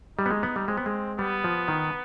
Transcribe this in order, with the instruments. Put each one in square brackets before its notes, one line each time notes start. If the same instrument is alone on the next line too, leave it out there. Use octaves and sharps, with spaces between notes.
[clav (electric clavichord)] G3 [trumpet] D#4
[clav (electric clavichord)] B3
G#3
B3
G3
[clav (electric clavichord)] G#3 [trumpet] C4
[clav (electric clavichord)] B3
G#3
[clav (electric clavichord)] G3 [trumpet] B3
[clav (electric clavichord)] F3
D#3